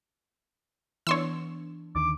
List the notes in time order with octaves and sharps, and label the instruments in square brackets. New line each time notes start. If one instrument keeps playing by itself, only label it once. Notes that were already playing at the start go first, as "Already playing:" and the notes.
[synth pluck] E3 B3 D4 [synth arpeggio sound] C#5 C6 E6
[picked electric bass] D#2 D3 D#3 [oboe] D6